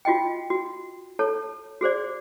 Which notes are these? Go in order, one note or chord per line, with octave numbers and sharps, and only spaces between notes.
F4 F#4 D#5 G5
F#4
A4 C#5 A5
F#4 G#4 C5 D5